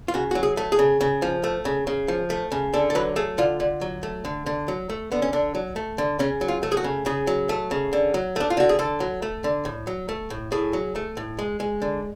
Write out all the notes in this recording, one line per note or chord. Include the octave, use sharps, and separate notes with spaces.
F4
C#3 F#4
F#3 F#4
G#4
A3
G#4
C#3
C#3
F3
A3
C#3
C#3
F3
A3
C#3
D3 A4
A4
F#3 B4
A3 G#4
D3 F4
D3
F#3
A3
D3
D3
F#3
A3
D3 B3
C#4
D3 D4
F#3
A3
D3
C#3 C#4
F#3
F4
A3
G#4
F#4
C#3
C#3 G#4
F#3
A3
C#3
D3
F#3
A3 D4
F4
D3 F#4
G#4
D3 A4
F#3
A3
D3
A2
F#3
A3
A2
A2 G#4
F#3
A3
A2
G#3
G#3
D3